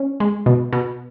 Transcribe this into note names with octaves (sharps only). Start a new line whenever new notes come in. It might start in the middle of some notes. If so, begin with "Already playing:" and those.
Already playing: C#4
G#3
B2
B2